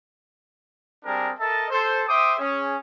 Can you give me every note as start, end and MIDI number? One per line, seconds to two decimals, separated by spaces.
1.05 1.31 55
1.05 1.31 60
1.05 1.31 62
1.05 1.31 68
1.05 1.31 70
1.39 1.67 69
1.39 1.67 70
1.39 1.67 75
1.39 1.67 76
1.39 1.67 81
1.71 2.04 69
1.71 2.04 72
2.08 2.34 72
2.08 2.34 76
2.08 2.34 79
2.08 2.34 86
2.08 2.34 87
2.39 2.77 61
2.39 2.77 68